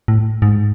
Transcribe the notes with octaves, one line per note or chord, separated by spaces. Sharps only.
A2
G#2